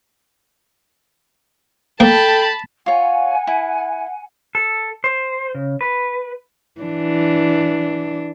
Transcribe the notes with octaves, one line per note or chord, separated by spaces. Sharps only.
A#3 A4 G5 A5 B5
F4 C#5 F#5 G#5
E4
A4
C5
C#3
B4
E3 D4